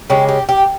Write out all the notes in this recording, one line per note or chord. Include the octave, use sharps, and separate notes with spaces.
C#3 G#3 G4
G4
G4